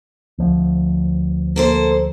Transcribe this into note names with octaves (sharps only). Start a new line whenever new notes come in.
D2 F3
A#3 A4 C5